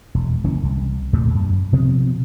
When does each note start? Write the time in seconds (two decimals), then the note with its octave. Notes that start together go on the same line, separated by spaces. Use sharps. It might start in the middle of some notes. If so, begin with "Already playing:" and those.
0.15 E1
0.44 F#1 E3 A#3 C#4
0.63 C2
1.13 D1 E2 A#2 A3
1.35 F#2
1.72 B2 F3 B3 C4